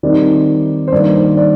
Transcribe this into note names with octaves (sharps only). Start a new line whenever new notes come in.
D#3 G3 C4 D#4 D5
C5
G2 D#3 A#3 D5
C5
D5